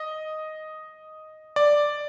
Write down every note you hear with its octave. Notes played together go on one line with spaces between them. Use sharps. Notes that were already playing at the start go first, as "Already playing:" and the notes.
Already playing: D#5
D5